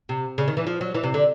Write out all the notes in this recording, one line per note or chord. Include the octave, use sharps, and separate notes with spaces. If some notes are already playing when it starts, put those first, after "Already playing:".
C3
C#3
D#3
E3
F3
F#3
E3
C3
D3